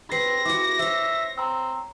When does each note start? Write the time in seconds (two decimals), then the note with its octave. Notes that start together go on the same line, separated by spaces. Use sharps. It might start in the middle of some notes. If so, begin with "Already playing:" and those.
0.12 C4 B4 A#6 C7
0.45 E4 F#4 D6
0.79 C5 C#5 E5
1.38 C4 A#5 E6